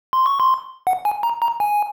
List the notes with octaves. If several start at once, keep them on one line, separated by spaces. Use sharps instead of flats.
C6
C#6
C6
F#5
G#5
A#5
A#5
G#5